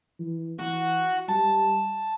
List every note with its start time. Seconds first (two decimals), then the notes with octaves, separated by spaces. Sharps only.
0.19 E3
0.59 E3 F#4
1.29 G3 A5